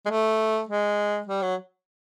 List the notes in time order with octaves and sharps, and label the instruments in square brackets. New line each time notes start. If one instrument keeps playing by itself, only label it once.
[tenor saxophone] G#3
A3
G#3
G3
F#3